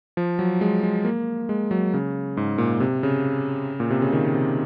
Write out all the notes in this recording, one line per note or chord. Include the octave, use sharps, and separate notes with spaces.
F3
F#3
G#3
G#3
A#3
G#3
F#3
C#3
G#2
A#2
C3
C#3
A#2
C3
C#3
D#3
C3